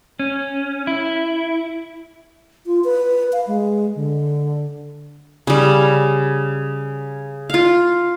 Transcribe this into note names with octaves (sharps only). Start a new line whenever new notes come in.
C#4
E4
F4
B4
F5
G#3
D3
C#3 G3
F4 F5